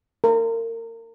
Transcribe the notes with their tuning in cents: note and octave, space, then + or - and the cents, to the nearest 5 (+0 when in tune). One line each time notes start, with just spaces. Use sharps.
A#4 -30